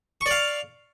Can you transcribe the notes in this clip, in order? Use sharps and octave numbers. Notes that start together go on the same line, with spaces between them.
D5 F5 C#6